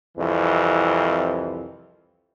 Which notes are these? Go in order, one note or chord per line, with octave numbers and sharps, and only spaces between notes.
C2 F2 E3